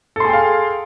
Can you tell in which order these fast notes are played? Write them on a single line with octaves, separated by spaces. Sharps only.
A4 C6 G#4 G5 F5